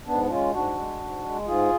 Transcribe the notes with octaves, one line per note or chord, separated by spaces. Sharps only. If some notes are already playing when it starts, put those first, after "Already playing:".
G#2 B3 D4
D4
G#3 C#4 F4
G#2 D4 F#4
G#3
G#2
G#3
G#2 F4 G#4